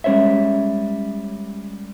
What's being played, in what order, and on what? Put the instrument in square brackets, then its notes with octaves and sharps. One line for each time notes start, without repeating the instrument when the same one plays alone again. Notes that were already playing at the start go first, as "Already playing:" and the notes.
[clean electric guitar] G3 G#3 C#4 C5 C#5 E5